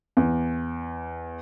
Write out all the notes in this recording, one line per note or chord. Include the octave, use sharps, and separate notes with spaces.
E2